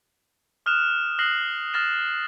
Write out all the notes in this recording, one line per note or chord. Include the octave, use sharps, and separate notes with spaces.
D#6 F6 F#6 E7 F7
D#6 F6 F#6 A#6 C7 F#7
D#6 F6 A6 A#6 E7